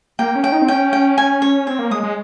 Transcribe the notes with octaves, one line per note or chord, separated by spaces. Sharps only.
A#3 G5
C#4
G5
D#4
C4
C#4 G5
G5
G#5
C#5
C4 C#5
A#3
G#3 D#6
G#3